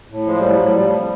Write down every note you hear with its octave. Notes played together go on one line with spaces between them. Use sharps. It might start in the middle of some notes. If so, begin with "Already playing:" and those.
A2
F3 G#3
A2 G3
F#3
A2
G3
F3
C3